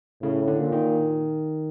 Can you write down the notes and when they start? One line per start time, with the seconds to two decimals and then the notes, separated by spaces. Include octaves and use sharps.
0.22 A2 C#3
0.47 D3
0.59 A#2
0.72 D#3